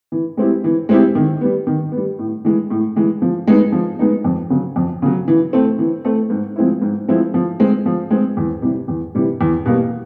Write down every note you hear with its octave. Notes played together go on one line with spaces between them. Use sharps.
E3
G#3 C4 E4 G4
E3
G#3 C4 E4 G4
D#3
G3 B3
D#3
G3 B3
A2
E3 G#3
A2
E3 G#3
F3
G#3 B3 D#4
F3
G#3 B3 D#4
F2
C#3 F#3
F2
C#3 F#3
E3
A3 C4
E3
A3 C4
G#2
F3 G#3 C4 E4
G#2
F3 G#3 C4 E4
F3
G#3 C4
F3
G#3 C4
E2
C3 E3 G3
E2
C3 E3 G3
E2
B2 G3 A#3